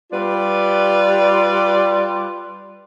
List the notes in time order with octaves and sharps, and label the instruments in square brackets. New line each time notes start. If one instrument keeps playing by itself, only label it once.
[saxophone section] G3 F4 B4 D5